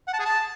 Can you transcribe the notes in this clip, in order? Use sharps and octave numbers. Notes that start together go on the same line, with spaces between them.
F#5
A5
G#4
A5